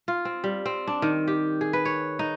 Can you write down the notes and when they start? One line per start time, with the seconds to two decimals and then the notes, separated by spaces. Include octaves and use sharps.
0.08 F4
0.25 C4
0.44 G3
0.66 C4
0.87 D4
1.02 D#3
1.27 G4
1.61 G#4
1.73 B4
1.85 C#5
2.19 D#4